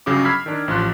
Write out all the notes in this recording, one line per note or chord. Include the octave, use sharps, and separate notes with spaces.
G1 C#3 F#3 C#4 D6
B5 E6 F6 G#6 B6 C7
D#3 D4
A1 F3 C6 F#6